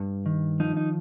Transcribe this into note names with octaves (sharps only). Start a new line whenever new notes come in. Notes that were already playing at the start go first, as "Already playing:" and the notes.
Already playing: G2
D#3
F3 D#4
D#4